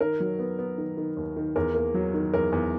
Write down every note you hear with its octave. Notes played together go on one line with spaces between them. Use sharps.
D#3 A#4
F#3
B3
B3
D#3
D#3
D#2
D#3
E2 A#4
A#3
F#3
D#3
E2 A#4
E2